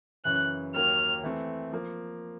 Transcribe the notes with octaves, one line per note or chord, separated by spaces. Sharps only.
F#2 C#3 E3 F#6
D#2 D#3 F#3 A#3 F6
E3 A3 C4
F3 A#3